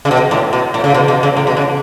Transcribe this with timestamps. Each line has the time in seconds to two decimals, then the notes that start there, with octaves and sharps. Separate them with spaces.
0.05 C#3
0.11 B2
0.31 A2
0.53 B2
0.74 A2
0.84 C#3
0.94 B2
1.08 B2
1.23 C#3
1.37 A2
1.47 B2
1.57 C#3